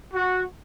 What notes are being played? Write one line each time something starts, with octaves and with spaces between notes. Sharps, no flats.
F#4